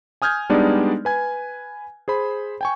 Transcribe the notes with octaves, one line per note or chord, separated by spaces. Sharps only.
G#5 D#6 F6 G6 G#6
G3 G#3 B3 D4 D#4 D5
B4 G#5 G#6
G#4 C5 B5
G5 G#5 C#6